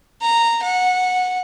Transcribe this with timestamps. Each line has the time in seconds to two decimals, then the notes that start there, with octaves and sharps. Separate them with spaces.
0.22 A#5
0.63 F#5